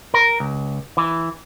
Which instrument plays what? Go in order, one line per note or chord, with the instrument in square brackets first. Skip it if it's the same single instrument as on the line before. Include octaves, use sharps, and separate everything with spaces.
[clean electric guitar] A#4
C#2
E3